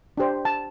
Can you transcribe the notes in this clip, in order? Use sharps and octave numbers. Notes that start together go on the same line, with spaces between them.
D4 G4 C5
A5